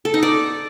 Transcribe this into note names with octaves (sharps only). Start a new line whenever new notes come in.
A4
D#4
D5